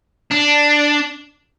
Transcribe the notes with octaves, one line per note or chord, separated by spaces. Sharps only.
D4